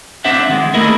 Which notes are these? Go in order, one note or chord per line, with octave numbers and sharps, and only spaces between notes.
C4 D4 C5 E5 F#5
D#3 F#3 G#3
A3 A#3 E4 G#4 A#4 D#5